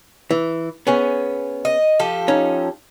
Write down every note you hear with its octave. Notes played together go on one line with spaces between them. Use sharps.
E3
B3 C#4 G#4
D#5
F3 G4 A4
C#4 D#4